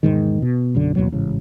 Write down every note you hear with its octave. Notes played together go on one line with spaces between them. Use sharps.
E1 B1 G#2 D#3
B2
B1 F#2 D3
A1 D#2 B2 F#3
A1 G#2 C#3